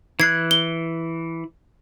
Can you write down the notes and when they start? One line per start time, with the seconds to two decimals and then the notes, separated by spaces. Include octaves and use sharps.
0.20 E3 F#6 G#6 C7
0.51 G7